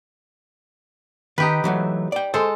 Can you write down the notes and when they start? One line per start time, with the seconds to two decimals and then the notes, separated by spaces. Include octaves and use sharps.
1.38 D#3 D#4 G4 B4
1.64 E3 F#3 A3
2.12 D5 G5
2.34 G#3 A4 C5